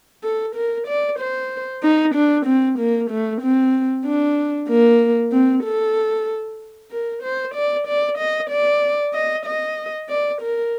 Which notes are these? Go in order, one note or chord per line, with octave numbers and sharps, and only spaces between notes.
A4
A#4
D5
C5
D#4
D4
C4
A#3
A3
C4
D4
A#3
C4
A4
A#4
C5
D5
D5
D#5
D5
D#5
D#5
D5
A#4